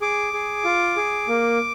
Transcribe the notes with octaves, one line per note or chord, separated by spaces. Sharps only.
G#4 D6
G#4
F4
G#4
A#3